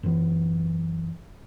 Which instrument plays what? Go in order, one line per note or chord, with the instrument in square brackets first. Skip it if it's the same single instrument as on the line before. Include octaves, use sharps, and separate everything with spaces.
[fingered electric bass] F#2 E3